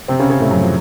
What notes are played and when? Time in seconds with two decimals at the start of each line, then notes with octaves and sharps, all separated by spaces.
0.08 C3 C4
0.19 C#3 C#4
0.30 C#3 C#4
0.40 A2 A3
0.51 F#2 F#3
0.62 F3